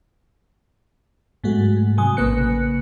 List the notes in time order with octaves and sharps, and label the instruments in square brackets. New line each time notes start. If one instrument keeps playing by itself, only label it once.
[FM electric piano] G#2 F#3 G#3 A3 F#4
C3 F#3 G#5 D#6
A1 C#3 A#3 B4 F#6 C#7